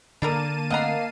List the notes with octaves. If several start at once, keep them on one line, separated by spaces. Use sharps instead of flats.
D3 A#3 D4 A4 A#4 A5 D#7
D3 A3 C4 D#5 F5 F#5 A#5 C7